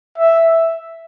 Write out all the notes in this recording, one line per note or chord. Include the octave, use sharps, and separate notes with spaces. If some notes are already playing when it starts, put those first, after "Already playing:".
E5